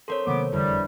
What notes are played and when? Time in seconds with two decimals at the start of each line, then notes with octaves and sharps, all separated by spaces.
0.08 C4 A4 A#4 C#5 C6
0.27 C3 D#3 F#3 A#3 B3 D6
0.52 F1 E2 D3 G3